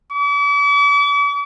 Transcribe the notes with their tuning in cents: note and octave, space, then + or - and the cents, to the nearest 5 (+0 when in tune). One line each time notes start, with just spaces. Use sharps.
D6 -45